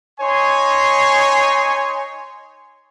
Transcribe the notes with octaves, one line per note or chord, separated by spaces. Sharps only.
D#4 C#5 G#5 C6